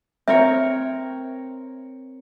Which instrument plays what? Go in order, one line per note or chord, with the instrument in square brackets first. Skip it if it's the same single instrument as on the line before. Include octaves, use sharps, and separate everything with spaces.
[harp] C4 A#4 C#5 [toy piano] E5